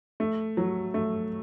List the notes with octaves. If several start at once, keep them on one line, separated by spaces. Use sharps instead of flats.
A3
F#3
A3